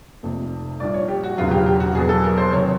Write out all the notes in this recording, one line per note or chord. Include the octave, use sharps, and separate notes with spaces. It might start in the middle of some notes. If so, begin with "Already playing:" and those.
F1 F2 C3
A#1 A#2 G3 D5
C#5
G4
F#4
E1 E2 C#3 F#3 F4
G4
G4
F#4
E2 B2 F#3 G#4
A4
A#4
C5
C3 D#3 F#3 C#5